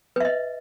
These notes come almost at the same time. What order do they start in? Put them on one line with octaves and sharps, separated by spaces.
B4 E5 D#5